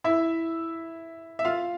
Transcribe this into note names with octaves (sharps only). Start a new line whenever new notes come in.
E4 E5
E5
F4 F5